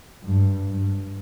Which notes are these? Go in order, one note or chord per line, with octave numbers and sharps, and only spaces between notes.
G2
G2